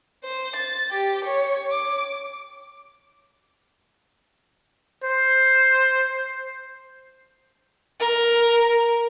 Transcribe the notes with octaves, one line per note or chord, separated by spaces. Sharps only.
C5
A6
G4
C#5
D6
C5
A#4